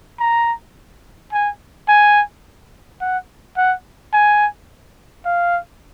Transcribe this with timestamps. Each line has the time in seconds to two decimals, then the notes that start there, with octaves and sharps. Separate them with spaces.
0.20 A#5
1.33 G#5
1.89 G#5
3.01 F#5
3.57 F#5
4.13 G#5
5.25 F5